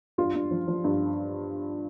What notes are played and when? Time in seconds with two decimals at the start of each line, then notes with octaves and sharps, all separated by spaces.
0.18 G2 F4
0.35 G2
0.51 F3
0.68 F3
0.84 G2